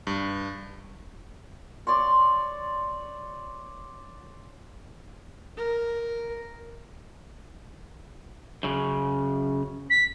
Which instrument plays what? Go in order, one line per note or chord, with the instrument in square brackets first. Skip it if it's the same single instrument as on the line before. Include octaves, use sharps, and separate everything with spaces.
[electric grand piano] G2
[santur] C#5 D5 C6 C#6
[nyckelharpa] A#4
[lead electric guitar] F#2 C#3
[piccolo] B6